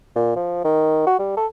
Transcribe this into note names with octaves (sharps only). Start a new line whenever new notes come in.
A#2
F3
D#3
F#4
G3
A4